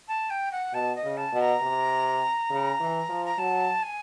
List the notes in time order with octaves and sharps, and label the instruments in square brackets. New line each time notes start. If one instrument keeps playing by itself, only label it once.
[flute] A5
G5
F#5
[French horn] B2 [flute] A5
[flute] D#5
[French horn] C#3
[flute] A5
[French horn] B2
[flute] A#5
[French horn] C3
C#3
E3
F3
[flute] A#5
[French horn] F#3 [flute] A5
[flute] G#5